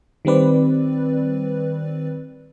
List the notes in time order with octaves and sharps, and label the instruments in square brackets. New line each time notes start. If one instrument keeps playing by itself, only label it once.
[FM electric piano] D#3 G3 C4 B4 D5